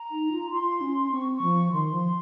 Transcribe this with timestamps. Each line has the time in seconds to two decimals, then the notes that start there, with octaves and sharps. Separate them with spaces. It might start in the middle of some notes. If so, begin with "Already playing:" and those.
Already playing: A#5
0.11 D#4
0.31 F4
0.51 F4 C6
0.81 C#4
1.11 C4 C#6
1.33 C#6
1.42 F3
1.72 D#3 C6
1.92 F3